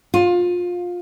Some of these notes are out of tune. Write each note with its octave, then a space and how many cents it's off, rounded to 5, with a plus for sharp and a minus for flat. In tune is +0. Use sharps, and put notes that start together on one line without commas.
F4 +20